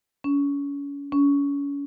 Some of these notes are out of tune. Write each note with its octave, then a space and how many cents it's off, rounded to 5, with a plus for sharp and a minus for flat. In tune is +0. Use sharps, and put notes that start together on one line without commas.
C#4 +35
C#4 +35